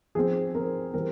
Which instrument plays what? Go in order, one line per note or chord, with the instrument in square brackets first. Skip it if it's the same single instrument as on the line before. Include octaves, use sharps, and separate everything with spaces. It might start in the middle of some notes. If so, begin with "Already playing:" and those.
[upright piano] F3 C4 G#4
F3 C4 A#4
E3 G3 C4 A#4